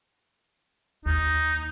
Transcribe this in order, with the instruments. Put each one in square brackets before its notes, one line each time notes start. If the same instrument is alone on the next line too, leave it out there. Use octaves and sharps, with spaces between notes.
[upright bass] D#2 [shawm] D#4